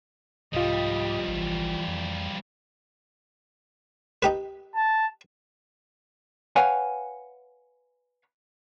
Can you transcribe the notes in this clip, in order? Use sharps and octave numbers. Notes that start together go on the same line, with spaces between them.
C2 G#2 F3 G3 F4 G4 D#5
G#1 E3
F2
D#4 G4 B4
A5
B4 C#5 F5 F#5 G#5